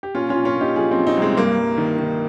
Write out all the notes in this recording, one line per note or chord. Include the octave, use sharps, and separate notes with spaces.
G4
A#2 C#4 F4
C#4 F4
A#2
C#4 F4
A#2 D#4 G4
F3 F4 G#4
F3 C4 D#4
C4 D#4
C2
G#3 C4
G2 A#3
G2
D#3
D#3